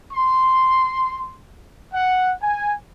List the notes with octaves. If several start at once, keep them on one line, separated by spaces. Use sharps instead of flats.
C6
F#5
G#5